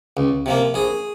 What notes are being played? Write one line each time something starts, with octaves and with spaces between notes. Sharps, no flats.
C#2
C3 F3 A#3
A#1 G#4